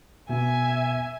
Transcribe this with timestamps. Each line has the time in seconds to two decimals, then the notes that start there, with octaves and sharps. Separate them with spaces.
0.29 B2 B3 E5 G#5